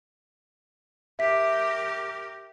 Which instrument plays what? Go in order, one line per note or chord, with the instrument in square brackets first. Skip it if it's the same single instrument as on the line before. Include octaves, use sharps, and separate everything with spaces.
[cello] G4 A#4 [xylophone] E5 B6